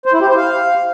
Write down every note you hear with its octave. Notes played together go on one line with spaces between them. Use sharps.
C5
E4
G4
C5
F5